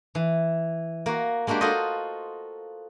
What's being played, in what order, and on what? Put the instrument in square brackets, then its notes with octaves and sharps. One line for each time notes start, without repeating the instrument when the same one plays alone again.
[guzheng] E3
A#3 F#4
G#3 A#3 D4 F#4 G4
F4 F#4 A4 C5 D#5